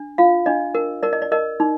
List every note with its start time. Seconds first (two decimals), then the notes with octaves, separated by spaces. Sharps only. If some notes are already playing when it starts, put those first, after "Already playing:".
Already playing: D4
0.18 F4 F5
0.46 D4 D#5
0.75 A#4
1.03 A#4 D5
1.13 D#5
1.22 D5
1.32 A#4 D#5
1.60 D#4